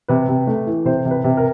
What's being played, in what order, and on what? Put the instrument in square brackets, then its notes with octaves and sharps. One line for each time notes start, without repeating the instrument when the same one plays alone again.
[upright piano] C3 B4
C3
A3
E3
C3 C5
C3
B4
C3
A#4